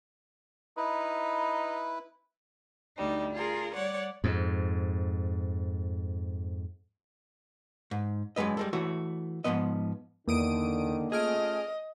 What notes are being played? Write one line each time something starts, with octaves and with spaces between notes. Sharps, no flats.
D#4 E4 B4
D2 G3 D#4
F4 G#4 A#4
G3 C#5 D5 F#5
F2 G#2
G#2
F#2 C#3 G#3 B4 D#5
G3 G#3 A4
E3 A3 F#4 C#5
G#2 D#3 F3 B3 D#5
E2 D3 D#3 A#3 D#6 D7
A3 C#4 F4 G#4 D#5 F6 D7